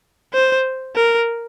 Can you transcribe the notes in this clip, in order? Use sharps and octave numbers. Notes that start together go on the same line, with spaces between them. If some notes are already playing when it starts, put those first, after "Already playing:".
C5
A#4